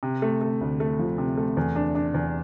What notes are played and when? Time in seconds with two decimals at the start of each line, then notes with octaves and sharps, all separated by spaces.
0.03 C3
0.22 A3
0.41 A3
0.61 D2
0.80 A3
0.99 F3
1.18 C3
1.37 A3
1.57 E2
1.76 D4
1.95 D4
2.14 E2